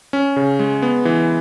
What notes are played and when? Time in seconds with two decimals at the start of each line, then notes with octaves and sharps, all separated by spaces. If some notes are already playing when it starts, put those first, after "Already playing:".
0.13 C#4
0.36 C#3
0.59 G#3
0.82 B3
1.05 E3